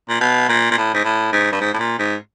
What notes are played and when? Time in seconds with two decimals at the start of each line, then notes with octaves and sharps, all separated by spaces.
0.09 A#2
0.21 B2
0.49 A#2
0.71 A#2
0.77 A2
0.94 G#2
1.04 A2
1.32 G#2
1.52 G2
1.60 G#2
1.74 A2
1.79 A#2
1.98 G#2